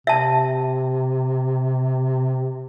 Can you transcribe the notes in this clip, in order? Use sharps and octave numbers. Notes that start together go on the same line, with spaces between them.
C3 E5 A5